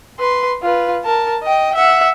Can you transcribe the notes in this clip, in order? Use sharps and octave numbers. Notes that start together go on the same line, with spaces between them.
B4 C6
F4 B4
A#4 A5
D#5 G5
E5 F#5